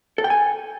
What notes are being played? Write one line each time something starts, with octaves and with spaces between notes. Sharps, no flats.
A4
G5
G#5